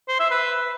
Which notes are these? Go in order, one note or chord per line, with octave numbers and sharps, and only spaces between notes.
C5
E5
B4